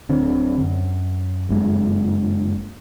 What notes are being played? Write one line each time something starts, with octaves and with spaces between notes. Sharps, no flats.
D1 D3 C4
F#2
F#1 G2 G#3